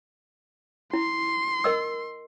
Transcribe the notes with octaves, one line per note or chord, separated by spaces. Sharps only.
E4 C6
A#4 D#5 E6